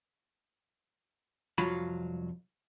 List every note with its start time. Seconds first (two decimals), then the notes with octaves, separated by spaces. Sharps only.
1.58 C2 F2 F#3 F4 B5